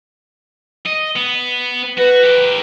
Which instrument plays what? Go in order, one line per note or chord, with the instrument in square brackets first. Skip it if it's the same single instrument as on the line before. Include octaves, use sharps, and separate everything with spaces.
[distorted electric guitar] D#5
B3
[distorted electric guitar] F#4 [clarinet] B4
[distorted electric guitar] G4 A#4